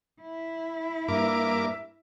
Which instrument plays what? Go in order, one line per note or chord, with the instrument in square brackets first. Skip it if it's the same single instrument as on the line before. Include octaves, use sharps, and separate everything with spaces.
[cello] E4
[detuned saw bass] G2 [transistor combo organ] A#3 D6 [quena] E5